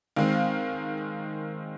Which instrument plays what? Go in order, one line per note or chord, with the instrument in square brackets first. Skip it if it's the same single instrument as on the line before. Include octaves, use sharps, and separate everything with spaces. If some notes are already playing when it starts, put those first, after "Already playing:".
[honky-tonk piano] D#3 G#3 C4 F5